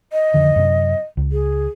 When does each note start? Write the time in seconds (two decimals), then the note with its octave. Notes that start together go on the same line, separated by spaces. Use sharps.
0.13 D#5
0.34 F2 D3 D#3
0.56 F#2 C3
1.17 C#2
1.32 G#4